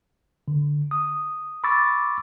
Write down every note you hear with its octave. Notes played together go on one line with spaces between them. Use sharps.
D3
D#6
B5 C#6 D6 E6 A6